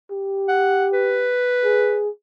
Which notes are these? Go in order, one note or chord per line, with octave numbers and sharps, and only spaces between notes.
G4
F#5
B4
G#4